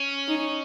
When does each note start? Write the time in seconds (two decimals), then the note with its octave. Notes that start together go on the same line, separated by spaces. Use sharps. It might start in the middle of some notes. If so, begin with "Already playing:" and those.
Already playing: C#4
0.28 D#4